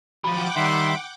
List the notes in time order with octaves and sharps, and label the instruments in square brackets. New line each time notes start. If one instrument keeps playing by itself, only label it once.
[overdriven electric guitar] F3 F#3 [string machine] F#5 G5 D6 [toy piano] B5
[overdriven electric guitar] D#3 [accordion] G3 E5 C6